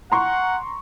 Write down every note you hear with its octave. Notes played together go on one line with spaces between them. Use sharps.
F#5 A#5 C6 C#6